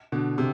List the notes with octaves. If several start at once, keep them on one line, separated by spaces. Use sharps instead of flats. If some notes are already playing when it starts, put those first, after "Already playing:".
B2 D3
C3